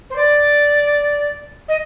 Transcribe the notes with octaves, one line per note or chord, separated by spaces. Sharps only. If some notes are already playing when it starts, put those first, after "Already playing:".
C5
D5
D#5